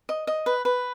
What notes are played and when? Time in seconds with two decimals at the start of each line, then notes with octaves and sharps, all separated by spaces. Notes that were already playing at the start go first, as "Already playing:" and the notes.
0.09 D#5
0.27 D#5
0.46 B4
0.65 B4